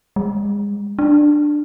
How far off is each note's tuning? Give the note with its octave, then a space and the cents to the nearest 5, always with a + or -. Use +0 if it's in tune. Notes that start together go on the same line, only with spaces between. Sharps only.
G#3 -30
D4 +10